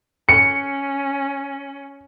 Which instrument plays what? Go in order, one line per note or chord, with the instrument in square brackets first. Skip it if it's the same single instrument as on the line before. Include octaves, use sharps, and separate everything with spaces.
[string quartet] C#4 [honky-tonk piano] C#7